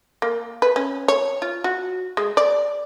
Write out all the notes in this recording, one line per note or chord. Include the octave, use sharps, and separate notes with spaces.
A#3
B4
C#4
C#5
F4
F#4
G#3
D5